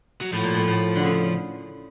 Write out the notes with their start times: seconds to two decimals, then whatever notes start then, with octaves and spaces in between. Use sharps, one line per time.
0.21 F#3
0.33 A2 F3
0.43 A#2
0.54 A2
0.68 A2
0.95 D3
1.04 C#3